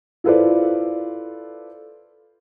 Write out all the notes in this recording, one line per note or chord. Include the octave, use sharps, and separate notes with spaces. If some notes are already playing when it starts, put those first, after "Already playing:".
E4 F4 A4 B4 C5 D5